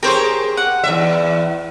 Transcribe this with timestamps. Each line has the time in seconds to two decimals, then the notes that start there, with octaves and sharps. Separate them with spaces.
0.03 G4 G#4 A#4 C5 C#5
0.57 F#5
0.83 E2 G2 E5